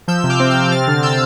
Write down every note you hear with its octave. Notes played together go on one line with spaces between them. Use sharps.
F3 E6 G6
C3
D6 F6
C4
C3 E6 G6
C4 F6 A6
D3
C4 E6 G6